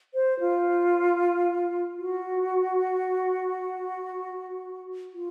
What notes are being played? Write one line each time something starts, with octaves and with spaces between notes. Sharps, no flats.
C5
F4
F#4
F4